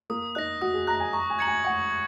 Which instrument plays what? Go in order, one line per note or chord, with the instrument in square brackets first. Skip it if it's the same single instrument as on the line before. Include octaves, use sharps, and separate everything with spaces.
[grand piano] A#3 [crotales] D#6
[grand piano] D#4 [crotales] F#6 A#6
[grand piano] F#4 [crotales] D#6
[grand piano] G#4
[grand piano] A#5 [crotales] F#6
[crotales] A#6
[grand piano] G#5
[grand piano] A#5 [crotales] C#6
[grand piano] G#5
[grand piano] A#5 [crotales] G#6 C#7 F#7
[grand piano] G#5
[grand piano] F#5 [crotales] C#6
[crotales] G#6